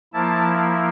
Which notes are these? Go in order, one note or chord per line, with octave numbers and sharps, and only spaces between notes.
F3 A#3 E4 A5